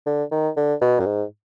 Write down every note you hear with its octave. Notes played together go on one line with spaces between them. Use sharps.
D3
D#3
D3
B2
F#2
G#2